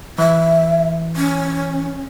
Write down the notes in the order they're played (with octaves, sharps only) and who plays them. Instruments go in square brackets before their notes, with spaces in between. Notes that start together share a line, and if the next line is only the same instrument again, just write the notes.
[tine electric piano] E3 [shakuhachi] E5
[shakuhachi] C#4